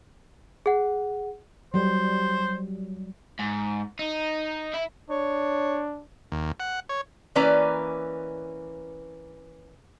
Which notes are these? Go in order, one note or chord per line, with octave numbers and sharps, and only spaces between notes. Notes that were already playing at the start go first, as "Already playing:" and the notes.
G#4 F#5
F#3 G3 C5
G#2
D#4
E4
D4 C#5
D#2
F#5
C#5
E3 A#3 C#4 B4 D5 A#5